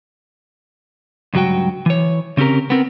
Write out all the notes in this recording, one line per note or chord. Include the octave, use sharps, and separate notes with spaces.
C#2 G2 F#3 F#4 G5
E3 C#5
C#3 C4 C#4 G4 A#4
B3 C4 A#4